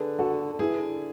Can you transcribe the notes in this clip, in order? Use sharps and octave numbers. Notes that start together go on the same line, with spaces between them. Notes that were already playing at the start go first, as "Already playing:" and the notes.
Already playing: D3 G#4 B4
F#4 A4
D3
E3 E4 G#4
D3